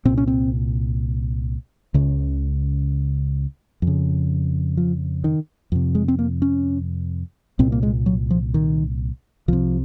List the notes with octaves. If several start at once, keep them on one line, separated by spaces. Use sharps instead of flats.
C2 A#2 C4
C#4
C4
C#2 C#3
F2
C#3
F3
D#3
F2 C3
G#3
C4
A#3
C#4
C2 A#2 C4
A#3
G#3
F#3
F3
D#3
C2 C3 F3